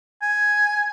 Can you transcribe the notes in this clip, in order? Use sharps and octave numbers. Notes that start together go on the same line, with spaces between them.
G#5